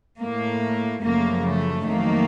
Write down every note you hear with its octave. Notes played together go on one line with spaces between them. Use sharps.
A2 A3 A#3
F#2 C#3 F3 A3 A#3
A3
F2 D#3 F#3 A3 A#3